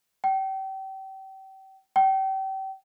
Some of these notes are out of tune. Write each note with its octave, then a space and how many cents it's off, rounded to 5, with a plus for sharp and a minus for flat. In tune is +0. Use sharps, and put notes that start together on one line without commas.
G5 -35
G5 -35